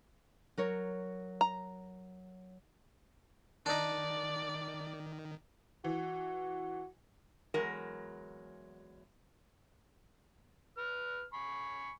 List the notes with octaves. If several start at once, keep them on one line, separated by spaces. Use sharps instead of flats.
F#3 A#4 C#5
A#5
D#3 D4 D#4 D5
E3 F#4
E2 F#3 G#3 A#4
B4 F6
G#5 B5 C#6